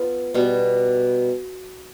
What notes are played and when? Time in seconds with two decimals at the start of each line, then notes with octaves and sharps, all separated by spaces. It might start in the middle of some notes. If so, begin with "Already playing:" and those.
Already playing: B3 F4 A4
0.34 B2 G3 B3